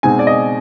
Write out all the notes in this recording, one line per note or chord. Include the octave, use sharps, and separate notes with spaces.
B2 G#3 C4 D#4 G#5
D5
D#5